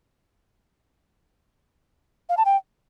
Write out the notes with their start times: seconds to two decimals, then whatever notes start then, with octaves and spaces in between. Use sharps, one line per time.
2.29 F5
2.37 A5
2.45 G5